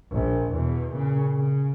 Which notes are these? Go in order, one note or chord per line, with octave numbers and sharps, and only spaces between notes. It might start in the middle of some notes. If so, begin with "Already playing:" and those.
A#1
E2 B2
A#2 C#3
C#3